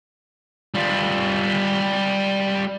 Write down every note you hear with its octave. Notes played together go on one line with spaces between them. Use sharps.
G3 F4